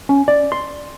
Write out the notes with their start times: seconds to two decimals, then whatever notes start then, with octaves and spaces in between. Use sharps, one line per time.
0.09 C#4
0.28 D5
0.52 C6